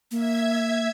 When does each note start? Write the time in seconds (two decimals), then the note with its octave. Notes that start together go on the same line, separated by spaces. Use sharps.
0.11 A#3 E5 G#6